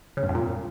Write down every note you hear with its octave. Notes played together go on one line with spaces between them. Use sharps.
C#3
G2
F2
A#2